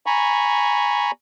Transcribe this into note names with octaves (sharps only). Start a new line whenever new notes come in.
G#5 A#5 B5 C#6